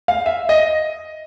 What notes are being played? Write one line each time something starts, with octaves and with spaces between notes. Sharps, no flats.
F5
E5
D#5